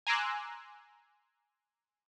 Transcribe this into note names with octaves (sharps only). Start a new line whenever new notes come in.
G#5 A#5 C6 D6 E6 F#6